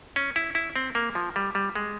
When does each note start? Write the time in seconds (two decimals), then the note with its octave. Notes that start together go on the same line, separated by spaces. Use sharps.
0.16 C#4
0.36 E4
0.55 E4
0.76 C4
0.95 A#3
1.15 F3
1.36 G3
1.55 G3
1.75 G#3